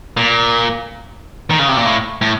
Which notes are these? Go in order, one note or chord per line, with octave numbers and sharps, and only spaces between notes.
A#2
D#3
C#3
C3
A#2
A2
A2